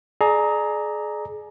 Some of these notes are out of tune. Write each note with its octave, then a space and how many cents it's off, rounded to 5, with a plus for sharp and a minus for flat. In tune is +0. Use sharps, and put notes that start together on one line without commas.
G#4 +30 D5 +25 A#5 +0